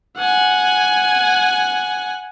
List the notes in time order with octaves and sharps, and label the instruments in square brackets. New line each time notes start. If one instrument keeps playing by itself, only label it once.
[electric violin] F#5 G#5